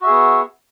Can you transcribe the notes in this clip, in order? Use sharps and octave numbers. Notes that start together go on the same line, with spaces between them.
B3 F#4 G#4 E5